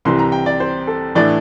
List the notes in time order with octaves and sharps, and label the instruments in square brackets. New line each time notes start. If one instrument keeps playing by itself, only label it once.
[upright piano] C2 C3 E3 C6
A#5
G5
D5
C5
A4
A2 E3 A3 D4 D5